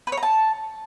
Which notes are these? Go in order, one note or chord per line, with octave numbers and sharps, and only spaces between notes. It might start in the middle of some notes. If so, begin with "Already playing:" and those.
B4
C#5
A#5
A5